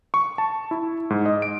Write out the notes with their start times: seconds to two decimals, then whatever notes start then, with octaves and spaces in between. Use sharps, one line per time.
0.14 C#6
0.38 A5
0.71 E4
1.10 G#2
1.26 D#5
1.42 D7